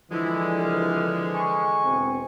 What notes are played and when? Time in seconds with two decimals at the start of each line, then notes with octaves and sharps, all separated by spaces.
0.11 D3 E3 F3 G#3 E4
0.59 C2 C#3 F6
1.35 G#5 C#6
1.85 E1 C4